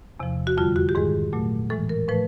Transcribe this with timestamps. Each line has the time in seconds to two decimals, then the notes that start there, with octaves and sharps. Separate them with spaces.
0.20 E2 C3 F3
0.47 F#4
0.57 F2 D3 G3 F4
0.76 F#4
0.89 G4
0.95 G#2 D#3 G#3 G#4
1.33 A#2 F#3 A3
1.70 A2 E3 G#3 A4
1.89 A#4
2.08 A2 F3 A3 B4